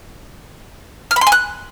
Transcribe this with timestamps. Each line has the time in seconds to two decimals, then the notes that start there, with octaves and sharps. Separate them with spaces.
1.11 F6
1.16 B5
1.21 C6
1.27 G#5
1.32 F#6